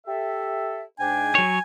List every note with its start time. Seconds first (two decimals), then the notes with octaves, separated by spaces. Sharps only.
0.06 G4 A4 E5
0.99 G#2 D4 G5 G#5
1.35 F#3 C#5